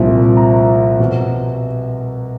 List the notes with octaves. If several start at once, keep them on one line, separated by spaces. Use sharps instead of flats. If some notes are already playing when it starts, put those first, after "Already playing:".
Already playing: C2 A#2 F3
A#5
B2